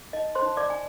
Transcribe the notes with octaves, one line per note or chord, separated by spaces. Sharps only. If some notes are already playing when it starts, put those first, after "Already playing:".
Already playing: G#4
D#4 D#5
C5 C6
D#4
D5 D6
D#4 G#5